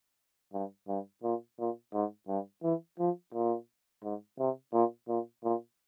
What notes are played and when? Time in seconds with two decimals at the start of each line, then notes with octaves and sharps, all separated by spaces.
0.53 G2
0.88 G2
1.23 A#2
1.59 A#2
1.94 G#2
2.28 G2
2.63 E3
2.99 F3
3.34 A#2
4.04 G#2
4.39 C3
4.73 A#2
5.08 A#2
5.44 A#2